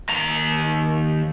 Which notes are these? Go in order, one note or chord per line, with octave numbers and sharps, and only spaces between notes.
D#2 A#5